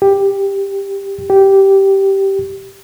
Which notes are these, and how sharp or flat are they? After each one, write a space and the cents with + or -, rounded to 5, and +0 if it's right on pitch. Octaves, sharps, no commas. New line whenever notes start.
G4 +10
G4 -10